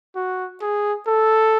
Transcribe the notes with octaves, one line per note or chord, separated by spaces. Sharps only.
F#4
G#4
A4